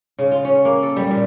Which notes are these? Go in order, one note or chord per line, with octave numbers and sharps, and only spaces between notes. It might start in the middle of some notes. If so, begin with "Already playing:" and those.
C#3
F4
C#4
A#3
A4
G3
A#2